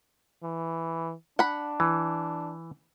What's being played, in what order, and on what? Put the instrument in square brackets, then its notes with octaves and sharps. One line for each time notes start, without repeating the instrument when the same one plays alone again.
[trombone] E3
[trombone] D4 [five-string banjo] F#5 B5
[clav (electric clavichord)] E3